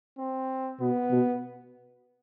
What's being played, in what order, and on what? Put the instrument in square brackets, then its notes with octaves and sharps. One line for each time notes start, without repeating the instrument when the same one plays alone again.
[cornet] C4
[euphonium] B2 [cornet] B3
[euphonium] B2